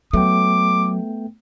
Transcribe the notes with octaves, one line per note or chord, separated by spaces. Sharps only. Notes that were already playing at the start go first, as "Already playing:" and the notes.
F#3 A3 B3 G5 D6